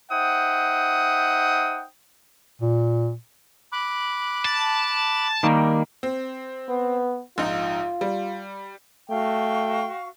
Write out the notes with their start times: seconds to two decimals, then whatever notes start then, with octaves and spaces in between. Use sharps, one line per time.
0.11 D#4 C5 E5 F#5 G5 D#6
2.61 A#2
3.73 B5 D6 F#6
4.45 A5
5.43 D#3 G3 A#3
6.03 C4
6.69 B3
7.38 A#1 G#2 D#4 F4
8.01 G3
9.10 A3 F#4 F5 G5 C#6